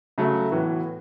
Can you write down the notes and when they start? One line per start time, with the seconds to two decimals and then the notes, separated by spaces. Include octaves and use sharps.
0.18 C#3 F#3 A3
0.51 A2 E3 B3 F#4